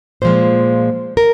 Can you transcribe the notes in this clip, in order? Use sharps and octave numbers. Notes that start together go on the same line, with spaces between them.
A#2 F3 G#3 C5
A#4